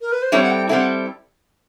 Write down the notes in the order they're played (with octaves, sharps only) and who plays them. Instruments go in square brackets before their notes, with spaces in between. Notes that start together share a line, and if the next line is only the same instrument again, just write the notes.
[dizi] A#4
B4
C5
[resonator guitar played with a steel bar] G3 C4 E4 A4 [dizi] C#5
[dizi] F#5
G5
[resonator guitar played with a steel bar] G3 C4 E4 A4 [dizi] F#5